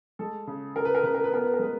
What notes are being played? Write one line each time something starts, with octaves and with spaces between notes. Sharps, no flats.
G#3 A4
C#3
C#3 A#4
B4
A#4
C#3 B4
A#4
B4
B3 A#4
B4
A#4
G#3 B4